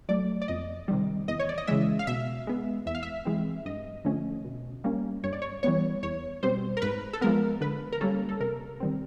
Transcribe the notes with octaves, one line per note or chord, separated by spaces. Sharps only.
F#3 A3 D5
D5
F2 D#5
C3 D#3 G3
E2 D#5
C#5
D5
D#5
C#3 E3 G#3 E5
F5
B2 E5
G#3 B3
E2 E5
F5
E5
C3 E3 G#3 C4
G2 D#5
D3 F3 A3 C#4
B2
G3 A#3 C#4
G2 C#5
D5
C#5
E3 G3 B3 C#5
E2 C#5
B2 G3 C4 C5
A#4
G#2 B4
A4
F3 G#3 B3 A#4
D3 B4
A#4
G3 A#3 C#4 A4
A4
C3 A#4
D#3 G3 C4